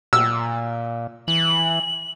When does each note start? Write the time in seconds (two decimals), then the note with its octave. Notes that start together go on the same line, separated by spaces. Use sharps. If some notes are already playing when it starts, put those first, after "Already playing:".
0.13 A#2 E6
1.28 E3 F#7